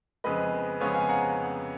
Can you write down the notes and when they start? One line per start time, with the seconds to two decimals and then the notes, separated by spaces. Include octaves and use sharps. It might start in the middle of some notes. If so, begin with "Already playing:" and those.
0.24 F2 C#3 G#3 B3 B4 D#5
0.80 F2 C#3 G#3 B3 C#5 F5
0.94 F5 G#5
1.09 F#5 A#5